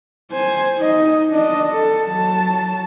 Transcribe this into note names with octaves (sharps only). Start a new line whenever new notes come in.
C5 G#5
D#4 D#5
D4 D#5
A4
F#3 A5